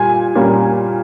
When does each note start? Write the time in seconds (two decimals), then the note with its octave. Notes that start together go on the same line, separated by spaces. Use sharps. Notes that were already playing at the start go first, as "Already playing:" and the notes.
Already playing: A#2 G3 G#5
0.35 A#2 G3 A#3 C#4